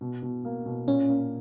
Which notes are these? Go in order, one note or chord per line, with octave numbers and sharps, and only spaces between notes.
B2
B2
A#3
B2
A#2 C#4
A#3